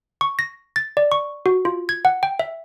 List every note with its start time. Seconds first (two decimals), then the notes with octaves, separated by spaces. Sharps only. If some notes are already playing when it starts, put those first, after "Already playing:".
0.21 C#6
0.39 A#6
0.76 A6
0.97 D5
1.12 C#6
1.46 F#4
1.65 F4
1.89 G#6
2.05 F#5
2.23 G5
2.39 E5